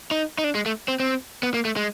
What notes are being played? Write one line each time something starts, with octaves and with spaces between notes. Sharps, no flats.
D#4
D#4
D4
G#3
A3
C4
C4
B3
A#3
A3
G#3